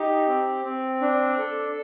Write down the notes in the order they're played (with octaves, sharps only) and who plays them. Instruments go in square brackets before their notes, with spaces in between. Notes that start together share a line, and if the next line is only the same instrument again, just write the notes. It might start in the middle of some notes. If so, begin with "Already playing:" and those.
Already playing: [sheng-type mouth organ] D#4 G4
C4
C4
D4
A4